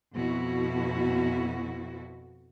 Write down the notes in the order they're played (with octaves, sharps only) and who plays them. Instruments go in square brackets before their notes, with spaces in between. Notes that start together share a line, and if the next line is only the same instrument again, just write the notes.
[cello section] F2 B2 E4 F#4